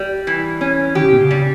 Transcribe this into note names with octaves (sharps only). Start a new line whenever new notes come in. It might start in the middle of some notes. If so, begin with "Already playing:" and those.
Already playing: G3
E3
C#4
D#3 G4
C#3
B2
C#3
G3